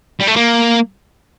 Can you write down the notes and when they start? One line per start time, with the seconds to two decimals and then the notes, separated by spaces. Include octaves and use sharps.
0.20 G3
0.27 A3
0.36 A#3